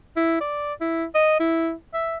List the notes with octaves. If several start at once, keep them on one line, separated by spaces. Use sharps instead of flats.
E4
D5
E4
D#5
E4
E5